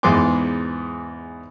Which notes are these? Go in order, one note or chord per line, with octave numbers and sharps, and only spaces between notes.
E2 G#2 B3 C6 D6